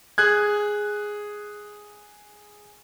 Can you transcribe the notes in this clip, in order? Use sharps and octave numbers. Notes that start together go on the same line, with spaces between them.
G#4 F#6 G#6